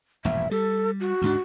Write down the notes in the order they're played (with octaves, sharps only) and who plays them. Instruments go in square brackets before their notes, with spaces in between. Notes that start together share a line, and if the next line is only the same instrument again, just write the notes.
[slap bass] E1 A#1 G2 [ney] E5
[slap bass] G3 [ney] A4
[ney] F#4
[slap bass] D2 G#2 D4